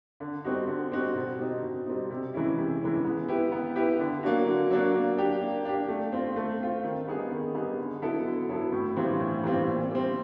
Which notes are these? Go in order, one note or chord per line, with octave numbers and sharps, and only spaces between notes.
D3
G3 C4 D#4 F#4
D3
G3 C4 D#4 F#4
B2
G3 C4 D#4
B2
G3 C4 D#4
C3
E3 G#3 C#4 E4
C3
E3 G#3 C#4 E4
B3
E4 G4 B4
B3
E4 G4 B4
D3
F#3 A#3 D4 F#4
D3
F#3 A#3 D4 F#4
A#3
D4 G4
A#3
D4 G4
A3
C4 F4
A3
C4 F4
D#3
G3 B3 D#4 G#4
D#3
G3 B3 D#4 G#4
D3
F#3 B3 E4 A4
D3
F#3 B3 E4 A4
A2
E3 G3 C4 F4
A2
E3 G3 C4 F4
A#2
G3 C4